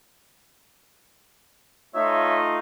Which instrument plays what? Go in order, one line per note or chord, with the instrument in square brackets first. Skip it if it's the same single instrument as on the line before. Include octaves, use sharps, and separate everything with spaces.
[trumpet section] A3 D#4 F4 [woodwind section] C#5 E5